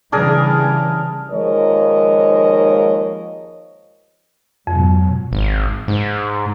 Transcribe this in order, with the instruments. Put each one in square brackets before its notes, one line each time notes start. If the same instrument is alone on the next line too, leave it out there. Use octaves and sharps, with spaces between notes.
[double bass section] C#3 E3 G3 [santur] D4 G#4 A#4
[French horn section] D#2 F3 G#3 A#4 C#5 D#5
[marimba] F2 [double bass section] G#2 B2 F#3
[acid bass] G#1
G#2